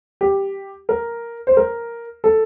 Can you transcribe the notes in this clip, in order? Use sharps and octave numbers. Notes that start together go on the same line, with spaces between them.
G4
A#4
C5
A#4
A4